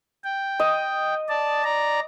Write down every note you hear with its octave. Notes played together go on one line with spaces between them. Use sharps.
G5
D#5
D5 A5
D5 A#5